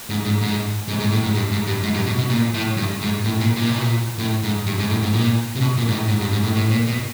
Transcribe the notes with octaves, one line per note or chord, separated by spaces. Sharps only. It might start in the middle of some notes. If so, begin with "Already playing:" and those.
G#2
G#2
G#2
G#2
G#2
A2
G#2
G2
G#2
G2
G#2
G2
B2
B2
A#2
A2
G2
G#2
A2
A#2
A#2
B2
A#2
A2
G#2
G2
G#2
A2
G#2
A#2
C3
B2
A#2
G#2
A2
G#2
G2
G#2
A2
A2
A#2
B2